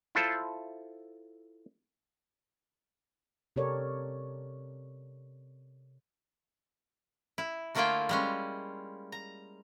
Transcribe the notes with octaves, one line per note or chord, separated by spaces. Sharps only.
E4 F4 A4 C5
C3 G4 A4 A#4 C#5 D5
E4
D3 A3 A#3 E4 F4 G5
G3 G#3 C#4
A#5